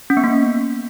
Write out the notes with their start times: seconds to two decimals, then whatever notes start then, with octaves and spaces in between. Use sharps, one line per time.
0.10 C#4
0.17 B3
0.24 A#3